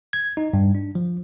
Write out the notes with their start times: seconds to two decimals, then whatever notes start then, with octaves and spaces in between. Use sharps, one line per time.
0.13 G#6
0.37 D#4
0.53 G2
0.75 D4
0.95 F3